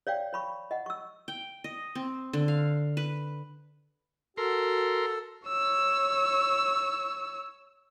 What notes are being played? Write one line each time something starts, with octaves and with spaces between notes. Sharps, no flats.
C#5 D5 F5 G5
C#5 B5 C#6
D#5 F#5
C#6 E6
G5
D#5
C4
D3
F5
B4
F#4 A4 A#4 C6
C#5 E6